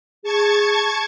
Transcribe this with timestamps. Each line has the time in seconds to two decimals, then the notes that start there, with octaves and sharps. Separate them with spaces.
0.23 G#4 A5 C#6 G#6